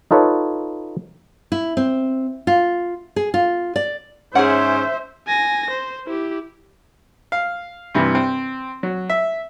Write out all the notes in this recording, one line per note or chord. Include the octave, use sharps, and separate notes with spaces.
D#4 F4 A4 B4 C#5
E4
C4
F4
G#4
F4
D5
G#2 C#4 G#4 C5 E5 F#5
G#5 A#6
C5
E4 G4
F5
G2 C3 E3
C4
F#3
E5